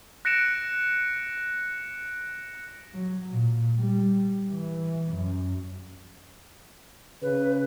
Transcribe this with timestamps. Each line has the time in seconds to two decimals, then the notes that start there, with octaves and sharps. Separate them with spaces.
0.25 F#6 A#6 C#7 D7 E7
2.94 F#3
3.30 A#2
3.79 G3
4.51 E3
5.13 F#2
7.22 C#3 B4